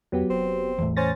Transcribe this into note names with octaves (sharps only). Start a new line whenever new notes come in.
E2 F#3 B3 G4
F1 C4
E2 A2
C#4 C5 A6 A#6